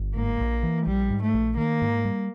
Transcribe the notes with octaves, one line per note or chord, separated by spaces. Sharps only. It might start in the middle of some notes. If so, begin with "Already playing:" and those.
Already playing: G1
G#2 A#3
A#1
E3
A#1 G3
G#2
A3
A#1
D#3 A#3
G#2
G3